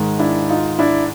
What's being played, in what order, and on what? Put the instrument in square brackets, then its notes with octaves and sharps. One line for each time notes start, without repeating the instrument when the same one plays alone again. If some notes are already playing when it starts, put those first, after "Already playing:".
Already playing: [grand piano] G#2 D#3 G#3
D4 E4
D#4 F4
D4 E4